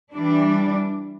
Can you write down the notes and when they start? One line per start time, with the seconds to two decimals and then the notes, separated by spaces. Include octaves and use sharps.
0.15 E3 G3 D4